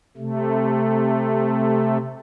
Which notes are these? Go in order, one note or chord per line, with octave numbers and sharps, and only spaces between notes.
C3 A3